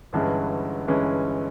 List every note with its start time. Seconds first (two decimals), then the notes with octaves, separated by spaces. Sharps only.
0.13 G1 G2 E3 G#3 C#4
0.88 G1 G2 E3 G#3 C#4